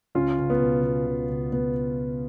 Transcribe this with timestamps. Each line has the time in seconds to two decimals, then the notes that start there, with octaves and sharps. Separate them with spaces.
0.15 C#2 C#4 F4
0.39 C#2
0.50 B3
0.61 B2
0.83 B2
1.07 C#2
1.28 C#2
1.52 B2 B3